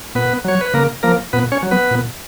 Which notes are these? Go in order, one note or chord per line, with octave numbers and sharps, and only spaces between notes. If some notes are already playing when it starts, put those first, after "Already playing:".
A#2 B3 B4
F#3 C#5
B4
C#3 A#3 A#4
F3 A#3 A#4
A#2 B3 B4
C#4 C#5
F#3
B3 B4
A#2